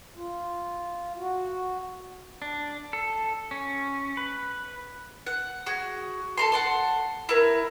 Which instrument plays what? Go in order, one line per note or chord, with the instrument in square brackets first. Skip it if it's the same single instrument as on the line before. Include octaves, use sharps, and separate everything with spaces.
[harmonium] F4
F#4
[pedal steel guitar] D4
A4
C#4
B4
[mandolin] F#5
F#4 G#4
A4 A#5 C6
F#5 A5 C6
E4 A#4